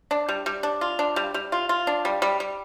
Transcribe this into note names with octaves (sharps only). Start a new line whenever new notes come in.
D4
G3
G3
D4
F4
D4
G3
G3
F4
F4
D4
G3
G3
G3